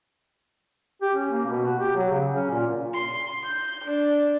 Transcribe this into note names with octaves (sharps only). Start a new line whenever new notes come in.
G4
C#4
A#3
B2
F#4
G4
F#3
C#3
C#4
A#2
C6
G6
D4